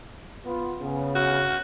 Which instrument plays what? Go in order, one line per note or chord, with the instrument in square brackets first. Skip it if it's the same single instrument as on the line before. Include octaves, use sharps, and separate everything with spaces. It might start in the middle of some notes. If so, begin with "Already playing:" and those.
[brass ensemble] B3 F4
C#3 B3
[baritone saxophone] F#4